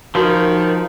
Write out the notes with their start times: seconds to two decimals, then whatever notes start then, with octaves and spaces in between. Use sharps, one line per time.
0.15 D#3 F3 F#4 A#4